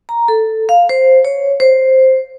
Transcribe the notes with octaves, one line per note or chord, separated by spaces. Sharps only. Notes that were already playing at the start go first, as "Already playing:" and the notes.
A#5
A4
F5
C5
C#5
C5